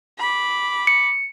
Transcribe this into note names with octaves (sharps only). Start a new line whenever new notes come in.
B5 D6
C#7